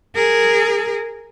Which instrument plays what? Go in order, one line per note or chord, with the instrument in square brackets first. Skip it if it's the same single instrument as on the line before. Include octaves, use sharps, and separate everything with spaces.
[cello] G#4 A#4